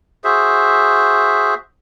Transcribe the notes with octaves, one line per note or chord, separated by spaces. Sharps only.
F#4 G#4 C5 E5